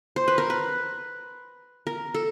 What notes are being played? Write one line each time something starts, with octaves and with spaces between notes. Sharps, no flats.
C5
B4
A#4
B4
A#4
A4